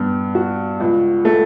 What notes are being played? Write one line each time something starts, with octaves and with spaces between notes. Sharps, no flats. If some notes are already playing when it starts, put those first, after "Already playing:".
Already playing: G2 B3
F#4
C#2
A3